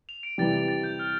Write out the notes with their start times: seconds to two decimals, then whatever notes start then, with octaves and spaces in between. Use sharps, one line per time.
0.09 F7
0.23 D7
0.38 C3 E3 G3 A6
0.53 A6
0.68 A6
0.84 G6
0.99 F6